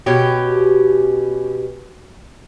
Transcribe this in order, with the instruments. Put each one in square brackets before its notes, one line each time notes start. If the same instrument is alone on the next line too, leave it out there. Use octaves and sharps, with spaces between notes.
[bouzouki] B2 C#4 G4